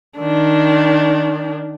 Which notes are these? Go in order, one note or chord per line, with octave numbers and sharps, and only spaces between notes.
D#3 D4